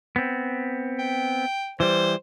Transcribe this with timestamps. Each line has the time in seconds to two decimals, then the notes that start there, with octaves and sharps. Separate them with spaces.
0.16 B3 C4
0.99 G5
1.80 E3 G3 C5